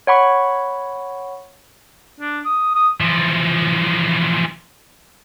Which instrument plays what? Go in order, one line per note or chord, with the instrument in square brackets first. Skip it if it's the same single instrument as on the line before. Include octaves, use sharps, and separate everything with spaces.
[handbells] C#5 F#5 B5 C#6
[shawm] D4
D#6
D#6
[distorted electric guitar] E3 F3